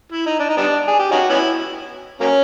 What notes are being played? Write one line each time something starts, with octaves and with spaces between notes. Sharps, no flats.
E4
D#4
D4
D#4
G3 B3 D4
G#4
G4
C#4 D#4 F#4
B3 C#4 E4
F#3 A#3 C#4